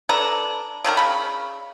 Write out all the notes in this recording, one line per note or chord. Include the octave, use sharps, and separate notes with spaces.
D4 A4 B4 A#5
D3 D#3 F#3 A#4
C#3 B5